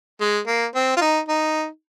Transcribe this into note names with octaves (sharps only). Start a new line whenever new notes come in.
G#3
A#3
C4
F4
D#4
D#4